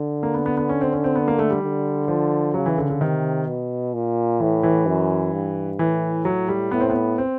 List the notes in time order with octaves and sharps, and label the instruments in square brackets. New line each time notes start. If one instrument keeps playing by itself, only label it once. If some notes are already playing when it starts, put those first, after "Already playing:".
Already playing: [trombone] D3
[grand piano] A#3
B3
B3
B3
C#4
C4
C#4
C4
B3
A#3
A3
G3
[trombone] D3
[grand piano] F3
[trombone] C#3 [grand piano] F#3
[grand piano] E3
D3
D3
[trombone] C3 [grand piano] D#3
[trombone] B2
A#2
[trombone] A2 [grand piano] E3
[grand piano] E3
[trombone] F#2
G2
[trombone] A2 [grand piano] E3
[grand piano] F#3
G3
[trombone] A2 [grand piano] B3
[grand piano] C4
B3
C4